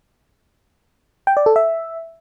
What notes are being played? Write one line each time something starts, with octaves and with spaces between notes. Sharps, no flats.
G5
D5
A4
E5